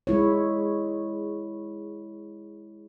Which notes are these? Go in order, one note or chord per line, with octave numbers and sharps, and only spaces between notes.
G#3 E4 C#5